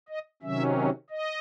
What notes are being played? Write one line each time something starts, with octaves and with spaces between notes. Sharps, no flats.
D#5
C3 D#3 F#3 C#4 E5
D#5